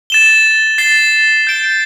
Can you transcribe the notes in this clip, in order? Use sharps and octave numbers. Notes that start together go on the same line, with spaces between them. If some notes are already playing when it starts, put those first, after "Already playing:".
A6 E7 G7
A6 C7 G7
G6 D7 G7